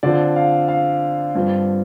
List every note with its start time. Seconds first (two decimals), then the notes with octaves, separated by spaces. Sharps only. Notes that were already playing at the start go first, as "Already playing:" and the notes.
0.03 D3 F3 C4 D5
0.36 F5
0.68 F5
1.35 G2 F3 C4